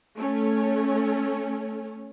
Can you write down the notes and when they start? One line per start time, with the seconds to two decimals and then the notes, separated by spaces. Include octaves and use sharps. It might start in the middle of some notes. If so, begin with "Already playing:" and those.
0.17 A3 C#4